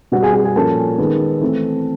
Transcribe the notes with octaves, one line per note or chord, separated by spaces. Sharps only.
B2 G3 B3 F#4 F#5
G#4 G#5
G#4 G#5
G#4 G#5
A#2 F3 A#3 C#4 A4 A5
D#3 G#3 B3
E3 A3 C4